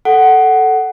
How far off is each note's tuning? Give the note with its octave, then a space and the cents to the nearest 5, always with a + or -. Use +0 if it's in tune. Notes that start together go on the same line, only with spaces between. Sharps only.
A4 +0 F#5 +15